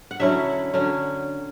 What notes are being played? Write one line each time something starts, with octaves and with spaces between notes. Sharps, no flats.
F#5
D3 F#3 C#4 E4 E5
D3 F#3 C#4